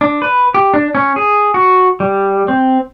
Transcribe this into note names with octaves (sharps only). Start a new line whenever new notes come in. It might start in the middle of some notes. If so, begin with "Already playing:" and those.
D4
B4
G4
D4
C#4
G#4
F#4
G3
C4